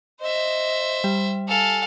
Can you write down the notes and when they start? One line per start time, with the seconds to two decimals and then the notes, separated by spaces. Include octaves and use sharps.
0.21 C5 D#5 E5
1.04 G3
1.48 A4 F5 G#5